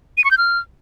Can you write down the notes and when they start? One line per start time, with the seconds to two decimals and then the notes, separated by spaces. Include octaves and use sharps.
0.18 D#7
0.24 C#6
0.31 G6
0.38 F6